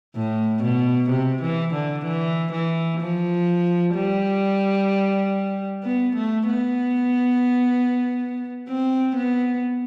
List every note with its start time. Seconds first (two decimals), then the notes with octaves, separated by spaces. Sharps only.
0.16 A2
0.62 B2
1.10 C3
1.42 E3
1.74 D3
2.05 E3
2.52 E3
3.00 F3
3.95 G3
5.83 B3
6.15 A3
6.48 B3
8.69 C4
9.16 B3